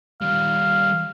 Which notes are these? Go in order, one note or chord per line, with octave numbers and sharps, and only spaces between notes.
D#3 G3 F5